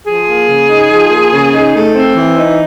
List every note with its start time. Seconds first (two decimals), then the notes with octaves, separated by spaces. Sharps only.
0.06 F3 G#4
0.27 A#3
0.48 C#3
0.69 D#4
0.91 F3
1.11 A#3
1.32 C#3
1.53 D#4
1.75 A3
1.95 C4
2.16 E3
2.38 D#4